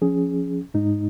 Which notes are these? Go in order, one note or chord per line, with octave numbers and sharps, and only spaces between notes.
F3 C#4 G#4
G#2 G#3 D#4